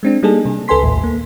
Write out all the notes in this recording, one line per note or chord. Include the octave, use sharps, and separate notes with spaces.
G#3 C4 D4
G3 A#3 D4 D#4 G#4 A4
C3
C#2 A4 B4 G#5 C6 B6
A#1 D#2 A2
A#3